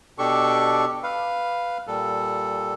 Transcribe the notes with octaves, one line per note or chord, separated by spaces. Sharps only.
B2 D4 G4 A4 C#6
B4 F5
A#2 G3 A4